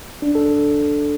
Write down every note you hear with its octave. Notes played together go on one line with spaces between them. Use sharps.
D4
A4